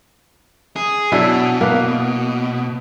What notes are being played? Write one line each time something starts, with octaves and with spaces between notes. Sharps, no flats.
G#4
B2 F#3 D4 E4
A#3 B4